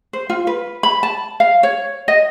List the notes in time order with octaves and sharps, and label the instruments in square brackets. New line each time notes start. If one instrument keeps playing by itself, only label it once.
[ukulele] C5
F4
B4
B5
A5
F5
C#5
D#5